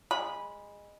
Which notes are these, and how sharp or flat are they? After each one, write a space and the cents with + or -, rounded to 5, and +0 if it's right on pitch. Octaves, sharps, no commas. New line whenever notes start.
G#3 -20 B5 -15